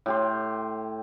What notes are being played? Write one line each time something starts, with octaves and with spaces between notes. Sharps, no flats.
A2 G4 C6